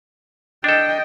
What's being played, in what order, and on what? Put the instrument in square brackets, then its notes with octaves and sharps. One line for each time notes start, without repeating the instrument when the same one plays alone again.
[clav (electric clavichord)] D4 A4 [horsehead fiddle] D#5 G5